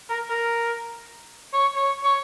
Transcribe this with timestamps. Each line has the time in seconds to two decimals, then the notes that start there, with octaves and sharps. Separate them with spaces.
0.10 A#4
0.31 A#4
1.54 C#5
1.76 C#5
2.05 C#5